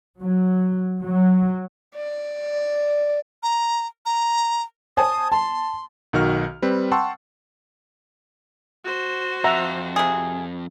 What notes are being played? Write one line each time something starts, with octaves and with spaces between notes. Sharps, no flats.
F#3
F#3
D5
A#5
A#5
C5 G#5 A5 D#6
A5 C6
B1 D#3 F#4 F6
G3 C4 B4
F#5 G5 A5 C6 C#6 E6
F#4 C5
F2 E5 F#5 A#5
C3 G#4